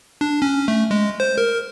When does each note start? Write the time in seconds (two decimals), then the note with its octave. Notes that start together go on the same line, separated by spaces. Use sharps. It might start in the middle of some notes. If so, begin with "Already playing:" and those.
0.21 D4
0.42 C#4
0.68 A3
0.91 G#3
1.20 C5
1.38 A#4